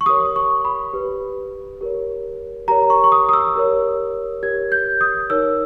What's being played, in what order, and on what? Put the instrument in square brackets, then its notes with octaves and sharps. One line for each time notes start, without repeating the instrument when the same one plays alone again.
[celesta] C#6
G4 A#4 C#5 D#6
C#6
B5
G4 B4
G4 A#4 C#5
G4 A#4 C#5 A#5
C#6
C#6
D#6
D#6
E6
G4 A#4 C#5
G4 A#4 C#5 G#6
G6
D#6
D#4 A#4 C#5 E6